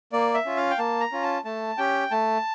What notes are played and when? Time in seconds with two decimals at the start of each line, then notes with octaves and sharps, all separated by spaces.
0.13 A#3 D5
0.34 E5
0.45 C#4 F4
0.57 F5
0.70 G5
0.78 A#3 A5
1.01 A#5
1.12 C#4 F4
1.23 A5
1.45 A3 A5
1.78 C#4 G4 G5
2.11 A3 A5